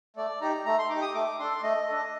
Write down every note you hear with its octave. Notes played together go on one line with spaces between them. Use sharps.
A3 D5
D#4 G4 A#5
A3 A#5
C6
D#4 D6
G4
D#6
A3 D6
D4 A4 C6
A3 D#5
D4 A4